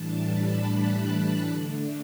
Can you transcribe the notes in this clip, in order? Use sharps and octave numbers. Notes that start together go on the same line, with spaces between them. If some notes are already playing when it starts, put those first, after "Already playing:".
Already playing: A2 E3 G3 D4 A5
B5
F#6
D3 A3 D4